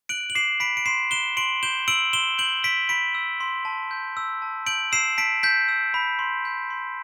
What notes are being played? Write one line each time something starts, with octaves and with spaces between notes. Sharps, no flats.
F#6 D7 F#7
F#7
D6 C7 E7
B5 B6 D7
D7
C6 C7 E7
F#6 E7 G7
C6 D7 F#7
G6 E7 G7
E6 D7 F#7
C6 E7 G7
G6 D7 F#7
E6 B6 D7
B5 B6 D7
E6
C6
A5
G6
E6
A5
G6 D7 F#7
E6 C7 E7
A5 B6 D7
G6 B6
E6
B5
C6
G6
C6